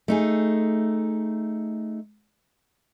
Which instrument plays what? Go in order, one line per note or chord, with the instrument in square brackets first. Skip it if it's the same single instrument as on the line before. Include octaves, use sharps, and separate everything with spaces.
[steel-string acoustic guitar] A3 D#4 G#4